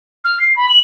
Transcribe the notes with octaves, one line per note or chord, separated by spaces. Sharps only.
F6
C7
B5
F#7